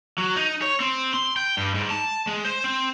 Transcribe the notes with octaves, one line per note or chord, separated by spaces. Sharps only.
F#3
D#4
C#5
C4
C6
G5
G2
G#2
A5
G#3
C5
C4